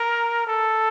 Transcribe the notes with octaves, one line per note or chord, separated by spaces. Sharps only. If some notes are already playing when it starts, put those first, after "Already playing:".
Already playing: A#4
A4